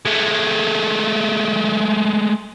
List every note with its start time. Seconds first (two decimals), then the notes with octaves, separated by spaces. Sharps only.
0.05 G#3 A3